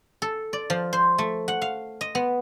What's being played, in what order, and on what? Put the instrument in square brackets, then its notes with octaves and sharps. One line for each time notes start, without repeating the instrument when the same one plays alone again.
[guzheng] A4
D5
F3
C5
A3
F#5
F5
D#5
B3